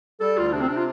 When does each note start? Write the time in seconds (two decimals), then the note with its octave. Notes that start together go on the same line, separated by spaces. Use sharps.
0.21 G3 A4
0.38 D2 F4
0.48 F4
0.53 C3 D4
0.61 C4
0.69 C3 D4
0.77 F4